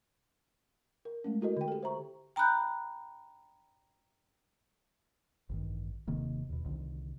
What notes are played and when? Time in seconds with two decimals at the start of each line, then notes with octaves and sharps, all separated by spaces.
1.05 A#4
1.24 G#3 A3 C#4
1.41 E4 F#4 A4 A#4 D#5
1.57 D3 G5
1.68 G4 A4
1.83 C5 E5 A#5 C#6
2.36 G5 A#5 B5 F#6 G6
5.49 A1 G2 D#3
6.07 D#1 C3 D#3 A#3
6.49 D#2 B2
6.66 C2 D3 D#3